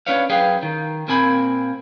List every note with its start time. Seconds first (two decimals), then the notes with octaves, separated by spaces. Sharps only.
0.07 C#4 D4 B4 C#5 F5
0.29 F#2 G#4 B4 F5 G5
0.62 D#3
1.08 A#2 A#3 C4 G#5 B5